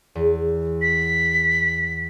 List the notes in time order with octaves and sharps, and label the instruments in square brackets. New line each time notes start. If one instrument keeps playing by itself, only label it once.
[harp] E2
[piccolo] B6